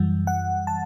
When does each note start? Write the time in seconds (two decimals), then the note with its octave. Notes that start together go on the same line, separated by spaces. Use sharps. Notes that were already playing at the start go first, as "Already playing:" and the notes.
Already playing: F#2 E3 G3
0.27 F#5
0.67 A5